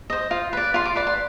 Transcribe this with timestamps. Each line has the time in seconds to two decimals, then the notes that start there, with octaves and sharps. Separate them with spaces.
0.10 C5 D#5
0.31 F4
0.53 B4 D5
0.74 F4 C6
0.86 D6
0.96 B4 D5 D6
1.07 C6